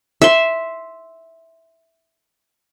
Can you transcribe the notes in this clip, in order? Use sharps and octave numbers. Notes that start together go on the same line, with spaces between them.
E5 C6